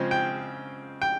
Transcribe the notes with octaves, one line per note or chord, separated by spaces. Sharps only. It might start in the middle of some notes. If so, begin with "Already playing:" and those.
Already playing: C#3 F3 G#3 C4
G5
G5